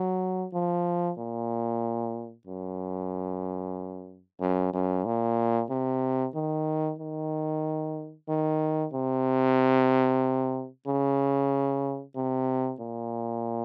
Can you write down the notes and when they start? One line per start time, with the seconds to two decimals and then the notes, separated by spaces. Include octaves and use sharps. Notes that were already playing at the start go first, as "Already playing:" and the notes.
Already playing: F#3
0.53 F3
1.18 A#2
2.47 F#2
4.40 F#2
4.73 F#2
5.05 A#2
5.70 C3
6.35 D#3
6.99 D#3
8.29 D#3
8.93 C3
10.87 C#3
12.16 C3
12.80 A#2